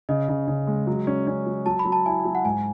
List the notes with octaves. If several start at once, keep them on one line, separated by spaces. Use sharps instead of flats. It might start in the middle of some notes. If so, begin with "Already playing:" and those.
C#3 D#5
C#3
C#3
G#3
F#3
C#4
C#4
F#3
F#3 A5
B5
F#3
A5
E4 G#5
F#3
F#5
G#2 G#5